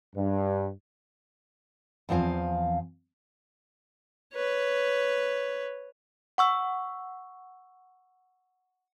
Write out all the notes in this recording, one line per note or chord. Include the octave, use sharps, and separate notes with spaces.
G2
E2 F3 C4 F5 G#5
B4 C#5
F#5 C#6 E6